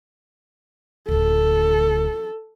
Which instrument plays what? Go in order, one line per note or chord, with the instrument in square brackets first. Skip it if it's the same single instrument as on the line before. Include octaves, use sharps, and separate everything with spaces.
[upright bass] D1 D3 [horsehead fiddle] A4